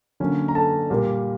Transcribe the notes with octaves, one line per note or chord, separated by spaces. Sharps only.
D3 F#3 A#3 C#4
A#5
A4 A5
A#2 G3 A#3